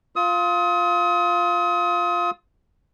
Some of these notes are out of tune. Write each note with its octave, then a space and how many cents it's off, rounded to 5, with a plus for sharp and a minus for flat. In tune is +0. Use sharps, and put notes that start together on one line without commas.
F4 +0 D#6 +35